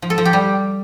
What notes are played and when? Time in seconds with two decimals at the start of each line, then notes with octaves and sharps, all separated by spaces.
0.02 F3
0.10 A4
0.18 F3
0.25 G4
0.33 G3